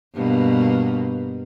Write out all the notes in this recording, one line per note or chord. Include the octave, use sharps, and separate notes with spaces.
G2 B2 A#3